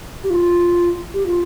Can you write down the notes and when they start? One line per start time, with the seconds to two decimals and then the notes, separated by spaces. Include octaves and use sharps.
0.24 G4
0.30 F4
1.14 G4
1.26 F4